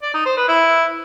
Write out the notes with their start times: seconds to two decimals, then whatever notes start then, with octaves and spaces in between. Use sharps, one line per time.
0.03 D5
0.14 D#4
0.26 C5
0.37 B4
0.48 E4